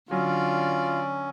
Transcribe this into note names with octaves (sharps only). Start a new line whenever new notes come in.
D3 F#3 C#4 F4 D5